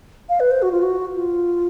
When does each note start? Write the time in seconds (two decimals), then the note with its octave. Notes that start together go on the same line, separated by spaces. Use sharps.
0.29 F5
0.40 B4
0.51 C5
0.62 F#4
0.72 F4
0.82 F#4
1.15 F4